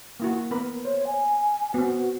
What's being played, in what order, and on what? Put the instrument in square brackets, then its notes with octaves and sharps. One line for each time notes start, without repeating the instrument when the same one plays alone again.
[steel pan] A#3 E4 F#4
B3 A#4 B5
[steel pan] C5 [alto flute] C#5
[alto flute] G#5
[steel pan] B3 C4 [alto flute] F#4